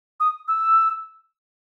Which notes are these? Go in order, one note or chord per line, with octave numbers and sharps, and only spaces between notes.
D#6
E6